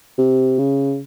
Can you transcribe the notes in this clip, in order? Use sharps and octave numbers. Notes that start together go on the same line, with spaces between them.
C3
C#3